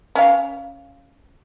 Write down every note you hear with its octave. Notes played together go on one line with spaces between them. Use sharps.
C#4 F5